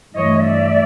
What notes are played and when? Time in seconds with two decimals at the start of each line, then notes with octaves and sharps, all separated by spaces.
0.15 G2 E3 A3 C#5 D#5
0.44 D5 E5